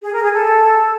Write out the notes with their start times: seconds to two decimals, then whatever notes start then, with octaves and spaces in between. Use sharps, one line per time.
0.02 G#4
0.13 A#4
0.23 G#4
0.33 A4